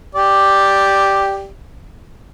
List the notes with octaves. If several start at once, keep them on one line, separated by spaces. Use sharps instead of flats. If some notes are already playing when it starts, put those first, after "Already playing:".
G4 D5